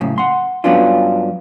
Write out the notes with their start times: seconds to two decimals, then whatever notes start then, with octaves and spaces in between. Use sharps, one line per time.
0.01 F#2 A2 C#3
0.18 F#5 C6
0.64 G2 F#3 B3 C#4 D4 F4